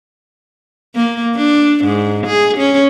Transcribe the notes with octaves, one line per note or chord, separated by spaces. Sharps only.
A#3
D4
G#2
G#4
C#4